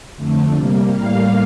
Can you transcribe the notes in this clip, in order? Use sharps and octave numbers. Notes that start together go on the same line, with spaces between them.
F2 D3 A3
C3 G3 A#3
A2 G3 A#3 F5